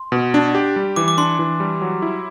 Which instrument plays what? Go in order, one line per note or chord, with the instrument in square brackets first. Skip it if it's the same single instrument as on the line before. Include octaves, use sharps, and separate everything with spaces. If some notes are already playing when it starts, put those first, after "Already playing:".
Already playing: [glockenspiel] C6
[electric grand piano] B2
D4
G4
G3
[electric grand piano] E3 [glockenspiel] D6
[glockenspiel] D6
[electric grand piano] D4 [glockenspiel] C6
[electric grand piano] E3
G3
F#3
E4